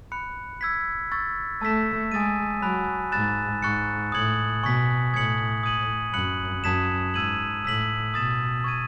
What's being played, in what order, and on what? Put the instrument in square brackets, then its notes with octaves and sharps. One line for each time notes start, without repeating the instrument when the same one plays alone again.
[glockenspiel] B5 F#6 C#7
E6 G#6 B6
C#6 E6 A6
[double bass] A3 [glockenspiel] A5 E6 B6 E7
[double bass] G#3 [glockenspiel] G#5 D#6 A6 D#7
[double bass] F#3 [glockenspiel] G#5 B5 F#6
[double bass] G#2 [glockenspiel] B5 F#6 A6 E7
[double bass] G#2 [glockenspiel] C#6 F#6 A6 C#7
[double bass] A2 [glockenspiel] D#6 G#6 C#7 F#7
[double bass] B2 [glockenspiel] G#5 C#6 G#6 B6
[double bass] A2 [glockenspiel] D#6 G#6 C#7 F#7
[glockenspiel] D#6 G#6 D#7 F#7
[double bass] F#2 [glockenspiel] B5 F#6 C#7 F#7
[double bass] F#2 [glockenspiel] A5 D#6 G#6 B6 E7
[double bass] G#2 [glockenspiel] E6 G#6 D#7 F#7
[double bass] A2 [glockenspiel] E6 B6 F#7
[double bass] B2 [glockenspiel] D#6 A6 E7
[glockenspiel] C#6 G#6 D#7